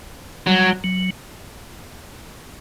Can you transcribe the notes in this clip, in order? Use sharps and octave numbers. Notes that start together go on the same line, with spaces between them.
F#3 G3
F#3